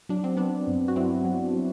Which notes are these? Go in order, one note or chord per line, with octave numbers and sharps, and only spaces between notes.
F#3 D4
C4
F#3 B3 D4
G2
F#4
F#3 C4 E4
F#3
F#3